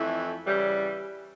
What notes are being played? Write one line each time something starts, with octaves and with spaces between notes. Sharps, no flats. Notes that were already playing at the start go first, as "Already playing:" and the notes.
Already playing: F2 E3 A3 E4
C#3 E3 G3